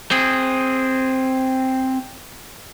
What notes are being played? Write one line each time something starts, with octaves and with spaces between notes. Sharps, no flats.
C4 G#4